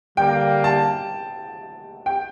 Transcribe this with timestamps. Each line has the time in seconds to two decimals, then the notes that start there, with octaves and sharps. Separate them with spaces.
0.17 D3 G3 A#3 G5
0.64 A5
2.06 G5